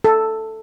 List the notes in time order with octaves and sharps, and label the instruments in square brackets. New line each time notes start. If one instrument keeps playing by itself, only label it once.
[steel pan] A4